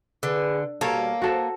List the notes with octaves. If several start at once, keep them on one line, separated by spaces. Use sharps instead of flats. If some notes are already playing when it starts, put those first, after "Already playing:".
D3 G#4 B4
B2 G3 A#3 A4 A#4 C#5
F#4 A4 C5